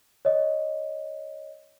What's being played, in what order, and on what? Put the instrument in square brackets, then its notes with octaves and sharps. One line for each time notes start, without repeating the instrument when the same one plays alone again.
[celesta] C#5 D#5